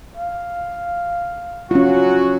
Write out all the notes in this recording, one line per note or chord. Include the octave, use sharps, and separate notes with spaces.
F5
F#3 C#4 F4 F#4